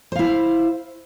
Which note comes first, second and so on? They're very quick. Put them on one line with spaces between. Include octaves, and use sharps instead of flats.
C5 F5 E4